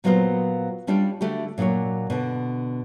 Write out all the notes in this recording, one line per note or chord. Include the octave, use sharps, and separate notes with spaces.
A#2 F#3 B3 F4 F#4 C5
G3 C#4 D4 F4 G4
D3 A3 F#4 G4
A#2 F#3 D4 A#4 C#5
B2 D3